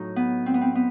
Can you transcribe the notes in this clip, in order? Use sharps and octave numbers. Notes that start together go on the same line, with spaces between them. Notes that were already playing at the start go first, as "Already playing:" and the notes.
Already playing: A2 F#3 D#4 F#4
B3
C4
B3
C4
B3